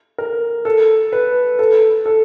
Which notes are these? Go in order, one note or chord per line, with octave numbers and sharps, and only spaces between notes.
A#4
A4
B4
A4
A4